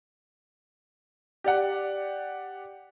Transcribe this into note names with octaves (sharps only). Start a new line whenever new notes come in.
G4 D5 F#5